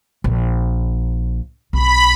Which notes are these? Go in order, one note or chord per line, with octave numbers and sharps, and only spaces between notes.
A#1
B1 F4 B5